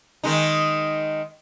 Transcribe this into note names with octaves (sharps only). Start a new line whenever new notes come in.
D#3 G#3 D#4